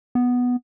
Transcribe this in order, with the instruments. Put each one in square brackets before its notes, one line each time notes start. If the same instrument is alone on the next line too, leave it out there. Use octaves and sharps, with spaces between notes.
[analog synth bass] B3